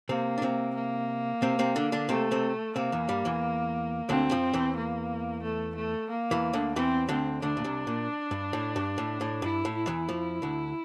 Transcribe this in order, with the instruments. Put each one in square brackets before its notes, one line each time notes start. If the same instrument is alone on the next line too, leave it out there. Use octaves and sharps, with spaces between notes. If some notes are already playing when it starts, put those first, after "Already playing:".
[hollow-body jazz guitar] C3 C4 [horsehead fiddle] A#3
[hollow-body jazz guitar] D4
C3 C4
[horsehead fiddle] A#3
[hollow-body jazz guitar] C3 C4
C3 C4
D3 D4
D3 D4
[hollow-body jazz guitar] C3 C4 [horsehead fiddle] A3
[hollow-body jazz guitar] C3 C4
[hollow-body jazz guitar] C3 C4 [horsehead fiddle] A#3
[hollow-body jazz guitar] E2 E3
G2 G3
E2 E3
[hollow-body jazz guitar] D2 D3 [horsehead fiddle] C4
[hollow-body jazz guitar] F2 F3
E2 E3
[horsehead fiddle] A#3
A3
A3
A#3
[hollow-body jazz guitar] E2 E3
D2 D3
[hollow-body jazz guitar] E2 E3 [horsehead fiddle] C4
[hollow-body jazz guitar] D2 D3 [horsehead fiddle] C4
[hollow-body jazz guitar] D2 D3 [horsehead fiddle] D4
[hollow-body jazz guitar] A#2
C2 C3
A#2
G2
A2
G2
A2
A2
[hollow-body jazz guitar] G2 [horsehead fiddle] E4
[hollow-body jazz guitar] A2
[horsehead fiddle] E4
[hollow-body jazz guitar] E2 E3
F2 F3
D2 D3